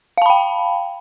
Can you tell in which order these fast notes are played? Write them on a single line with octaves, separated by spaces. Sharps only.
F5 A5 B5 G5